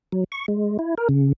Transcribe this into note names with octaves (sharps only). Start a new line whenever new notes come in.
F#3
C#6
G#3
E4
A#4
C#3